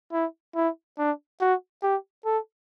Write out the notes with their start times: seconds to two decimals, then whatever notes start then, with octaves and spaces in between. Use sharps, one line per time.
0.13 E4
0.56 E4
0.99 D4
1.41 F#4
1.83 G4
2.25 A4